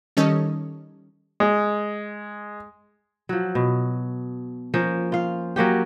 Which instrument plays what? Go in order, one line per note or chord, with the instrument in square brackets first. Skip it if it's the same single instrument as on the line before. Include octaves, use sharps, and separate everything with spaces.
[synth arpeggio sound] D#3 G3 C#4 A4 C#5 D#5
[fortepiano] G#3
[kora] F3 F#3
B2
F3 A#3 C#4
F4 F5
F#3 A#3 C#4 G4